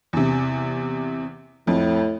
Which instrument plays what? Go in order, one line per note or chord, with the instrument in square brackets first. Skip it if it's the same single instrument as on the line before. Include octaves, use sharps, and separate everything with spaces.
[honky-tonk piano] E2 C3
[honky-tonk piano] F2 [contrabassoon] A2